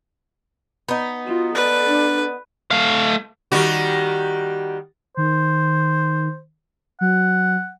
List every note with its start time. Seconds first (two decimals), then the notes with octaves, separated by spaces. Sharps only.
0.88 B3 D#4
1.26 F4 F#4
1.55 A4 B4 D5
1.87 D4
2.71 A3 F5
3.52 D#3 G3 F#4
5.17 D#3 C5
7.01 F#3 F#5